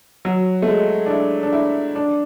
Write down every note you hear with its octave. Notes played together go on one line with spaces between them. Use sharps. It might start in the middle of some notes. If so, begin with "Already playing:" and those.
F#3
A3
G#3
D4
E4
D4
E4
D4